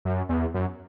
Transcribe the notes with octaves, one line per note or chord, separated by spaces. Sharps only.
F#2
E2
F#2